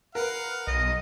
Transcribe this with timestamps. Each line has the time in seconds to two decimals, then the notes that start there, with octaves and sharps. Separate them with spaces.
0.15 A#4 B4 F5 F#5
0.67 B1 D#5